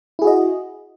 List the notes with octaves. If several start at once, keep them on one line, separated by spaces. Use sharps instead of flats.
E4 F#4 G#4 D#5